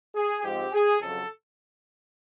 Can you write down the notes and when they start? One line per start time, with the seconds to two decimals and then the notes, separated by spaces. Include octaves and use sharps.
0.15 G#4
0.44 G#2 F3 G#3 C4 G4
0.72 G#4
1.01 F2 C#3 F#3 A4